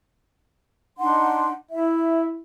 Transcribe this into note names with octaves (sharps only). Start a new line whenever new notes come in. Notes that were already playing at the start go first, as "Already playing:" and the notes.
D4 D#4 F#5 C6
E4 E5